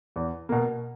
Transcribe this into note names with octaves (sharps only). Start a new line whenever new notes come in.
E2
B2 A#3